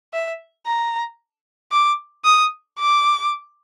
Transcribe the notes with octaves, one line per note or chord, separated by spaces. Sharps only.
E5
A#5
D6
D#6
D6